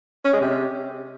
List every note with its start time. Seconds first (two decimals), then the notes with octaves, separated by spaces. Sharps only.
0.25 C#4
0.33 G#3
0.41 C3